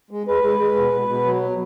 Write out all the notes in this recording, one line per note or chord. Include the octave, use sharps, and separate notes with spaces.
G#3
G#3 B4
G#3
G#3
B2
B2
B2
F#3